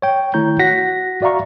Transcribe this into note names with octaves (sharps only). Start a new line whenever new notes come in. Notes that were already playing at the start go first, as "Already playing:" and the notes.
C#5 G5
D#3 A3 E4 C#5 A#5 G6
F#4 F#5 F#6 A#6 B6
F#4 D5 E5 F5 A#5 C#6